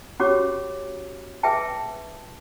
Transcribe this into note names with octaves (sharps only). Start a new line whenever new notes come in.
C#4 F#4 G4 C#5 D6
G#4 B4 E5 G5 A5